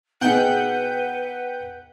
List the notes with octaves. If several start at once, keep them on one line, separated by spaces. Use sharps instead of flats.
B2 D#4 G#4 B4 F#5 G5 G6